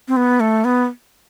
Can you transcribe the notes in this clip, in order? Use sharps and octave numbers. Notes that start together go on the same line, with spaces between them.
C4
B3
A3
B3